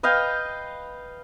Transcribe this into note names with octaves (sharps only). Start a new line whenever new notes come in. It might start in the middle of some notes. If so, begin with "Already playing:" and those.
B4 D#5 F5 G5